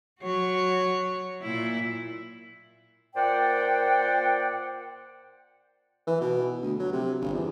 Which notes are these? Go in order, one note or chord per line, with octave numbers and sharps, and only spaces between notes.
F#3 F#4 C#5
A#2 E4
A#2 C5 D5 F#5 G5
E3
B2
D2
F#3
C3
G1
E2